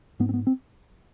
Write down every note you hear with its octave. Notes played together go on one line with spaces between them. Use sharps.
G#2 B3
C4
B3
C4